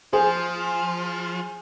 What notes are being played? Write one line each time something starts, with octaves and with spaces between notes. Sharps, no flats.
F3 G#4 C5